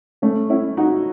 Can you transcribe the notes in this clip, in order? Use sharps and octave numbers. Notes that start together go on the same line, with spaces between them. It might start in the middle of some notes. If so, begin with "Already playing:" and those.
A3 C#4
C#4 E4
D#4 F#4